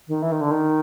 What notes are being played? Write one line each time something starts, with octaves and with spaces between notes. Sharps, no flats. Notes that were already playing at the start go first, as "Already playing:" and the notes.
D#3
E3
D#3
D3
D#3